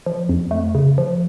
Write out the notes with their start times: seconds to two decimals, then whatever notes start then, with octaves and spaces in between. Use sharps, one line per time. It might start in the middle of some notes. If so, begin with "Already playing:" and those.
0.06 F3
0.29 F2
0.51 A3
0.75 C#3
0.98 F3